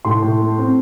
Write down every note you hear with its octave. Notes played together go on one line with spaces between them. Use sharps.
A2 C6
A2
A3
C4